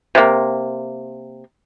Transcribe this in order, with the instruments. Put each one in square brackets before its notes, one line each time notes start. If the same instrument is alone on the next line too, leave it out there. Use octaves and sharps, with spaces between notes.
[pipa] C3 A#3